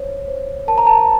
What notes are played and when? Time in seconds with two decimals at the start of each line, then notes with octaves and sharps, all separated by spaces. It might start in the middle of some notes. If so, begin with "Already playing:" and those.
Already playing: C5 C#5
0.28 C5
0.67 A#4 A5
0.78 A#5
0.87 A5